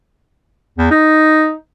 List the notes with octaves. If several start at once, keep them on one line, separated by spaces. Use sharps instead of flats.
E2
D#4